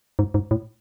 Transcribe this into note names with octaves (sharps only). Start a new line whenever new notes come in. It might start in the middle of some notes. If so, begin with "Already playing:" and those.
G#2
G#2
A2